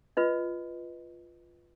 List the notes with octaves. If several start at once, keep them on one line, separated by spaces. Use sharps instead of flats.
F4 B4 D#5